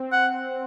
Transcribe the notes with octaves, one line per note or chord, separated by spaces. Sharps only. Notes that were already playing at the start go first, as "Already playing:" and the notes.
Already playing: C4
F#5